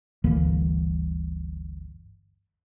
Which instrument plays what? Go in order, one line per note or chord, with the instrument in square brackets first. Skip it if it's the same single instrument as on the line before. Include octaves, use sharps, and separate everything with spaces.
[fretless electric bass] G1 D2 E3 A#3